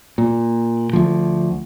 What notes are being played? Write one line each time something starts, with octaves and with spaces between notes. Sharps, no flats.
A#2
D2 F3